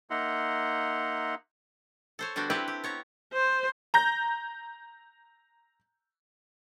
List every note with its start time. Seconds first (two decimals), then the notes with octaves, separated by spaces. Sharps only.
0.10 A#3 D#4 E5 F#5 A#5 C6
2.19 A4 C5 C#5
2.36 D3 G3 B3 D4 F#4 C5
2.50 C4 D4 E4 G4 B4 F#5
2.68 G4
2.84 B3 C#5 A#5
3.33 C5
3.94 A#5 G6 A#6